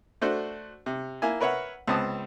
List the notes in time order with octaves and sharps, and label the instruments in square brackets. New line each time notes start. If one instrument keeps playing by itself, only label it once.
[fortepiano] A3 D4 F#4 C5
C3
A#3 E4 G#5
A#4 B4 C#5 E5 F#5
C#2 B3 C4 A5 D#6